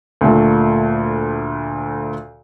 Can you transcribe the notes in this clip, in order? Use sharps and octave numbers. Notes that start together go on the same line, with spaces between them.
D2 A#2 A3